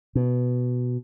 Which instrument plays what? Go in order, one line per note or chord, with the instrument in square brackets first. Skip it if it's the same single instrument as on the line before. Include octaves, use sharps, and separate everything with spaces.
[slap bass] B2